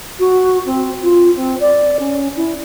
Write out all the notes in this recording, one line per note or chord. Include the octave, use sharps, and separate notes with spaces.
F#4
C4
F4
C4
D5
C#4
E4